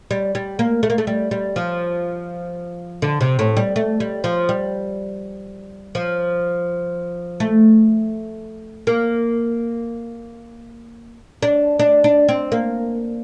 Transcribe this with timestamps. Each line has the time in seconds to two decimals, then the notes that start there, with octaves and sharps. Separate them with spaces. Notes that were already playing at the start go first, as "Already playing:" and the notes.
0.11 G3
0.35 G3
0.59 A#3
0.83 A3
0.90 A#3
0.98 A3
1.07 G3
1.31 G3
1.56 F3
3.02 D3
3.21 C3
3.39 A2
3.57 G3
3.76 A3
4.00 G3
4.24 F3
4.49 G3
5.95 F3
7.40 A3
8.87 A#3
11.43 D4
11.79 D4
12.04 D4
12.29 C4
12.52 A#3